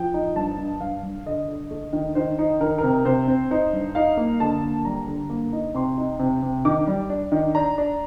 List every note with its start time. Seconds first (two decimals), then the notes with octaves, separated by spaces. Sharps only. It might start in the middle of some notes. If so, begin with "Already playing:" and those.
Already playing: F3 G5
0.14 D#4
0.36 G2 A5
0.58 G2
0.80 G2 F5
1.03 G2
1.26 D3 D#5
1.48 D3
1.71 A3
1.93 D#3
2.15 D#3 C5
2.39 D#4
2.60 D#3 A#4
2.78 C3 A#4
3.05 C3 C5
3.28 C4
3.51 D#4 C5
3.73 G2
3.95 D#4 F5
4.17 A#3
4.40 D3 A5
4.63 A#3
4.85 G3 A#5
5.07 D3
5.30 A#3
5.53 D#4
5.74 C3 C6
5.97 D#4
6.19 C3
6.42 C3
6.65 D#3 D6
6.87 G3
7.09 D4
7.32 D#3
7.55 D4 A#5
7.78 D4